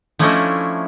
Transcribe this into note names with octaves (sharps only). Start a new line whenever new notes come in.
F3 A3 C#4 D4 E4 D#5